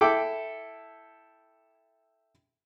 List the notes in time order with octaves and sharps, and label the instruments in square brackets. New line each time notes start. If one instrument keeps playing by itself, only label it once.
[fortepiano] E4 A4 G5 D6